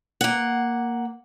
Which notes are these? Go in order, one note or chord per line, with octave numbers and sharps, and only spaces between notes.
A#3 F#5